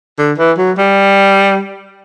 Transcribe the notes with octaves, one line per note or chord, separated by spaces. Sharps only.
D3
E3
F#3
G3